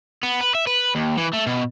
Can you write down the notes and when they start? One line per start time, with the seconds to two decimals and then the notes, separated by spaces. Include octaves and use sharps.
0.23 B3
0.41 B4
0.55 E5
0.67 B4
0.95 D#2
1.18 E3
1.33 A3
1.47 B2